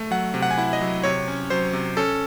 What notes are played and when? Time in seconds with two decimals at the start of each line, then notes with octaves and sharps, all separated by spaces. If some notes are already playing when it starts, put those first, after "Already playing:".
Already playing: A3
0.11 F#3 F#5
0.34 C3
0.42 F#5
0.51 G#5
0.58 E4 F#5
0.73 D#5
0.81 F#3
1.04 C3 C#5
1.28 C#4
1.50 F#3 C5
1.73 C3
1.97 C#4 A4